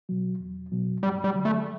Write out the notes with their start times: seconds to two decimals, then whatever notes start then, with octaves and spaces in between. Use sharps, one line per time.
0.09 B2 F#3
0.40 E2
0.72 B2 F#3
1.03 G2 G3
1.24 G3
1.34 D3 F#3
1.45 A3